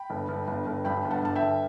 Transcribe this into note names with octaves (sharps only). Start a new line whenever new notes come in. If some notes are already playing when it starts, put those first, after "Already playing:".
Already playing: G5 B5
G1
G1
G1
G1
G2 G5 B5
G1
F#5 A5
G1 A5
E5 G5
G1